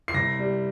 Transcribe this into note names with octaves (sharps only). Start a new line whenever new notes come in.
C7
C2 A#6
G3